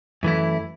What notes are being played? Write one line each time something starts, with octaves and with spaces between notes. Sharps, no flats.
F#2 E3 A3 E4